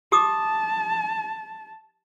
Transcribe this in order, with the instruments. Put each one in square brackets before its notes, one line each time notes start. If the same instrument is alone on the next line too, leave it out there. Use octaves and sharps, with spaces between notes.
[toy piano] G4 D6 D#6 [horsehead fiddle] A5